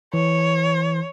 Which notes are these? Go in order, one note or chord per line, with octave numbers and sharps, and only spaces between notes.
E3 C#5